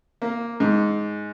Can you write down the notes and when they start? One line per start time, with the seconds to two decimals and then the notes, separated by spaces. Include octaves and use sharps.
0.22 A#3
0.60 G#2